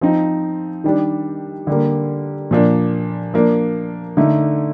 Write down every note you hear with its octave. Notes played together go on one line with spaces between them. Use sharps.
F3 C4 D#4
D#3 G3 D4
D3 G3 A#3
A#2 F3 A#3 D4
F3 A#3 D4
D3 A3 D#4